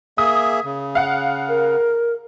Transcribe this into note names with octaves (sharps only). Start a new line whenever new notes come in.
A#3 G#4 E5 D#6
C#3
F5 F#5
A#4